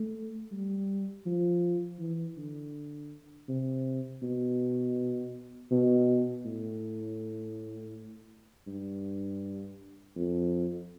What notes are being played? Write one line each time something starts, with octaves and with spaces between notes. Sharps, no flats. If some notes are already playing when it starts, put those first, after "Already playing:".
Already playing: A3
G3
F3
E3
D3
C3
B2
B2
A2
G2
F2